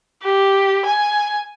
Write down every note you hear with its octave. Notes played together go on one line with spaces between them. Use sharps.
G4
G#5